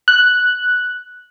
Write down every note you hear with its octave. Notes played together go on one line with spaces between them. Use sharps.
F#6